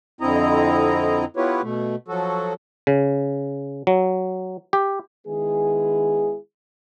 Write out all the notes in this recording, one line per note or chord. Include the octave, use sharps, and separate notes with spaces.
F2 D3 C4 E4 D#5 A#5
B3 E4 F4 G4 B4 C#5
B2 A3
F3 F#3 F#4 A4
C#3
F#3
G4
D#3 G#3 B3 E4 G#4